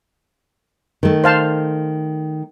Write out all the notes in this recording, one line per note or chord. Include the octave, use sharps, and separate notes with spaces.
D#3 A3
C5 F5 A5